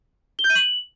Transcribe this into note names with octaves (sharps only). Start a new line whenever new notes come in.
G7
G6
D#7
F#7